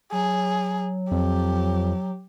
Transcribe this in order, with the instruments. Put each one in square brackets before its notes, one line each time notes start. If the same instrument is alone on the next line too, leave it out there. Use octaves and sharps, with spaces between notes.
[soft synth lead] F#3 [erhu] G#4
[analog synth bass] F2 [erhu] G4